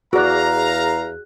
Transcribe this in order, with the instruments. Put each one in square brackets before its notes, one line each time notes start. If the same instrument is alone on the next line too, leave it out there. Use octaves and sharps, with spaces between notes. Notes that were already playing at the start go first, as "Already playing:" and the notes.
[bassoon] E2 [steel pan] F#4 D5 [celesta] G#4 F#6 [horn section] F5 A#5